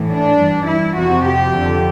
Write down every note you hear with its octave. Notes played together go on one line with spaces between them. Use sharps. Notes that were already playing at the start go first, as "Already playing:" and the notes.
Already playing: A2 E3
D4
G2 E3
E4
F2 C3 F3 F#4
G4
F2 D3 F3